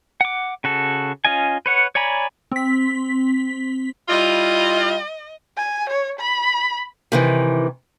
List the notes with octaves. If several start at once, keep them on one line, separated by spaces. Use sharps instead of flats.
F#5 D6
C#3 F#4 A4
C#4 F4 D#5 G#5
B4 C#5 F#5
C#5 D5 G#5 A#5 B5
C4 B6
G3 E4 F4 D#5
G#5
C#5
B5
C3 D#3 E3